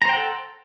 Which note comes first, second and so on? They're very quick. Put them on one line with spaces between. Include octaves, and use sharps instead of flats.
A#5 C5 G5 F#5 A4